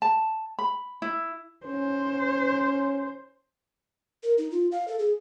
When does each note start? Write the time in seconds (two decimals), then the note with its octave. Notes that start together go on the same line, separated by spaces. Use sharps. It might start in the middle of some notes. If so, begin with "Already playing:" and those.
0.02 A5
0.59 B5
1.02 E4
1.66 C#4 C5
4.23 A#4
4.38 D#4
4.52 F4
4.72 F5
4.88 A4
4.99 G#4